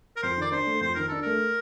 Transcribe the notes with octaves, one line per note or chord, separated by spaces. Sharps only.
A#4
F2 C5
D#3 D5
D4 C5
A3
F2 C5
D#3 A#4
D4 A4
A3 A#4